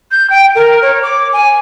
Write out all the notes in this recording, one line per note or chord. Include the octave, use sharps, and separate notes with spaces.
G6
G5
A#4
C#5
D6
G#5